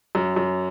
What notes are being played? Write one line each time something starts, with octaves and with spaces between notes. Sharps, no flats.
F#2
F#2